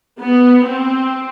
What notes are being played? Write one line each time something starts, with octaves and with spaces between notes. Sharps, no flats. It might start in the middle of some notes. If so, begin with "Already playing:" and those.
B3
C4